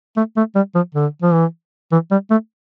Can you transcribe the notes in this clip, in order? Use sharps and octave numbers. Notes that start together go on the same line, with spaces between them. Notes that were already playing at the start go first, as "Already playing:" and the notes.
A3
A3
G3
F3
D3
F3
E3
E3
G3
A3